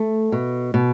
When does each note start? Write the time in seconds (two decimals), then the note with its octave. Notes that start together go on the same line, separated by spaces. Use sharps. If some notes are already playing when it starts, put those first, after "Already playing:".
Already playing: A3
0.32 B2
0.74 B2